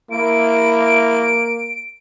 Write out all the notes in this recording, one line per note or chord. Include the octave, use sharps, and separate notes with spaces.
A#3 E4 D7